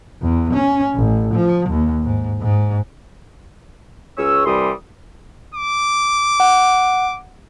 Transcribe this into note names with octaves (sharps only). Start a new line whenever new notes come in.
E2
C#4
A1
F3
D#2
G#2
G#2
C#2 C#4 C#5 E6
C2 E3 G3 C6 D#6
D6
F#5